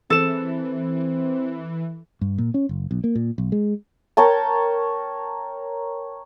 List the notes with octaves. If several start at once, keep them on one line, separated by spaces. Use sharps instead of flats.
E3 C4 A4 E7
G2
A#2
C#4
F#1
B1
A#3
A#2
B1
G#3
A#4 C#5 G5 A5